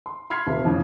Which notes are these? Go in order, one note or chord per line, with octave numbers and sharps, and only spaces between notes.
C6
B5 C6 F6 G#6 C7
D#1 C3 E5
F2 A2 C#3